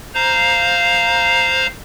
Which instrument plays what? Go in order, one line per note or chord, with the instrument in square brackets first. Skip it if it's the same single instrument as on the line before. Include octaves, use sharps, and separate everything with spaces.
[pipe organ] C5 F5 A#5